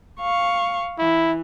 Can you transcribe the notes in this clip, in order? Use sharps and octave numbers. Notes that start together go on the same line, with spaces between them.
F5 C#6
E3 E4